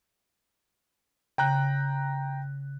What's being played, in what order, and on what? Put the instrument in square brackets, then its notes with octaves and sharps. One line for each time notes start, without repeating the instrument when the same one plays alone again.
[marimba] C#3 [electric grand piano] G5 A#5 F#6